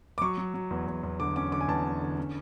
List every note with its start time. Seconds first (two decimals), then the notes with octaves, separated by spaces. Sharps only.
0.18 D6
0.21 F#3 C#6
0.38 F#3
0.54 F#3
0.71 E2
0.87 E2
1.03 E2
1.20 D3 D6
1.36 C#4 D6
1.52 D3 D6
1.61 G#5
1.68 E2 A5
1.85 C#4
2.01 D3
2.18 C#4